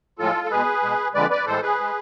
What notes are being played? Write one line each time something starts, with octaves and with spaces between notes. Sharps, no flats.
A2 F3 G#3 F4 A4
A4
B2 G#3 G#4 B4
B2 G#3
F2 D3 G#3 B4 D5
B4 D5
A2 E3 G#3 A4 C5
G#4 B4
G#3